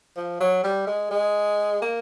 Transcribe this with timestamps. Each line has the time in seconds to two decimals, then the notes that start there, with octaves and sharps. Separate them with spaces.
0.17 F3
0.41 F#3
0.64 G3
0.87 G#3
1.11 G#3
1.82 A#3